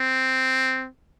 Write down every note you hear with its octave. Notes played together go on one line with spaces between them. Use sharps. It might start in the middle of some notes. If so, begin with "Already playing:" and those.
Already playing: C4